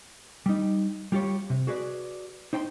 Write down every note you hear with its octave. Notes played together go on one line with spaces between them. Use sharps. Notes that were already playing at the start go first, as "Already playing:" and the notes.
G3 D#4
G3 F4 G4 C#5
C3
F#4 G#4 B4 D5
D#4 C5 G5 A#5 C6